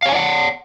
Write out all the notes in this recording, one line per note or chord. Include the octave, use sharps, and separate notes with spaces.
C#5 D5 F5 F#5 G#5